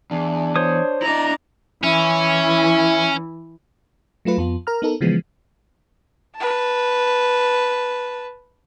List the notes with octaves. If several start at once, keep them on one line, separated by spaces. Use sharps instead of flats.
E2 D4
C5 C#5 D#6
D4 E4 D#5 A#5
E3 C#4 E4
F#3 A3 F4 B4
F2 B3 F4
A#4 A#5 F6
B3 D#4 A4 A#4
C#3 E3 F3 G#3 B3
B4 A5